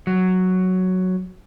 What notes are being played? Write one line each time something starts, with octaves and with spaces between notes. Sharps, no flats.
F#3